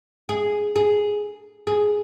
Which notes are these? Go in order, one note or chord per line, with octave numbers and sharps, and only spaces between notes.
G#4
G#4
G#4